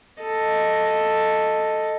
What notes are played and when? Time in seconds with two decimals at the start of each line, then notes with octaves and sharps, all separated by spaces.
0.21 A4 D#5